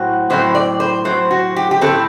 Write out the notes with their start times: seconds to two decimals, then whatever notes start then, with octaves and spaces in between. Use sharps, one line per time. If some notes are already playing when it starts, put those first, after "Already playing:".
Already playing: A2 F#3 C4 F#4
0.30 A2 F#3 C4 C5
0.55 D5
0.80 C5
1.05 A2 F#3 C4 C5
1.31 F#4
1.56 G4
1.71 G4
1.81 F#3 C4 A4
1.86 A2